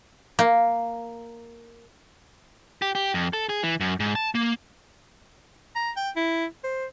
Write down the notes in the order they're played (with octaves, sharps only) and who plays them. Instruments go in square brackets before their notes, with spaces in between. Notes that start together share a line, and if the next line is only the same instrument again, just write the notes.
[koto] A#3
[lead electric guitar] G4
G4
F2
A4
G#4
E3
F#2
G#2
A5
A#3
[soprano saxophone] A#5
G5
E4
C5